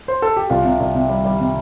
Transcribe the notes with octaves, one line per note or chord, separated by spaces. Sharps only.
C5
A4
G4
C2 F4
C3
C2
C3
G3
G3
C3